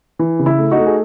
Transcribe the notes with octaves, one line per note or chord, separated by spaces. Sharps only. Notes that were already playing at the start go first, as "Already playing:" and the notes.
E3
C#3
E4
A3
D#4 F#4
A3
G#4